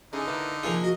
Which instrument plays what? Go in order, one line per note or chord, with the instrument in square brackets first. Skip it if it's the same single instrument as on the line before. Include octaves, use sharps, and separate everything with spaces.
[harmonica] D3 D#4 [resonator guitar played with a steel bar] C#4 E4 G#4
[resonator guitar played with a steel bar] A#3 E4 B4
[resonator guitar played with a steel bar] C3 G#4 [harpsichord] F3 A#3 F4
[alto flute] F#4 [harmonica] D#5